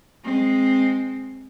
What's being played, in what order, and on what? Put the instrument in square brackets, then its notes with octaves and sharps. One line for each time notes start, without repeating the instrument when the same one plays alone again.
[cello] G#3 C4